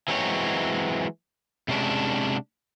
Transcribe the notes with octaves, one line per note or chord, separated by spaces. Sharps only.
E3 F#3 G#3 C4 C#5
C3 G#3 C#4 D4